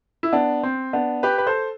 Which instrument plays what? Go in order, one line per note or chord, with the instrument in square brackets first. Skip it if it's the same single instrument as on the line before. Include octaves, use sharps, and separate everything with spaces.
[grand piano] E4
B3 D4
C4
B3 D4
G4 B4
B4
A4 C5